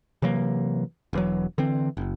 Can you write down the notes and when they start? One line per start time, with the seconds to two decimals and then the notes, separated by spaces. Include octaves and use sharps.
0.22 C3 E3 F#3 A#3
1.13 E1 E3 F#3
1.58 D3 E3 C4
1.97 F#1